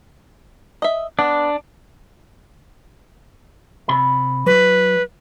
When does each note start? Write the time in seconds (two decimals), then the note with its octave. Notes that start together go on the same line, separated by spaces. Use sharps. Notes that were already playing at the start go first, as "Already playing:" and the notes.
0.82 D#5 E5
1.19 B3 D4
3.89 C3 B5
4.46 F#3 B4